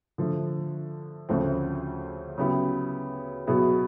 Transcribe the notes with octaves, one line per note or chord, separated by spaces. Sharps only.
D3 F3 A3
D2 C#3 F3 A3 C4
C#3 F#3 B3 E4 G4
B2 F#3 B3 E4 G#4